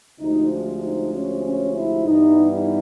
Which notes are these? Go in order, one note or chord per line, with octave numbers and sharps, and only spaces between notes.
D2 C3 F3 G#3 D#4
D4
D#4
C#4
C#4
E4
G2 E3 G3 B3 D#4
D#4